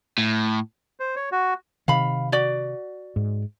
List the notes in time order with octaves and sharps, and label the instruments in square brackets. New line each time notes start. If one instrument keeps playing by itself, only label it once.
[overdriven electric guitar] A2
[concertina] C5
C#5
F#4
[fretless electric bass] C3 D#3 [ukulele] F5 B5
[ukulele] F#4 D5
[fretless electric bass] G#2